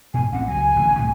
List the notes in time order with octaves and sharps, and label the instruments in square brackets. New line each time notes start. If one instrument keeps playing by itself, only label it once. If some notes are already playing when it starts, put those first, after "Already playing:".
[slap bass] G#2 B2 [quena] G#5
[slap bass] A1 C4 [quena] F#5
[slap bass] C#2 F#3 [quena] G#5
[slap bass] A1 D3
C2 A2 C3